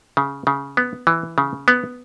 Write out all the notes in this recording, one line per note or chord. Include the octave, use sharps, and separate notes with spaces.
C#3
C#3
B3
E3
C#3
B3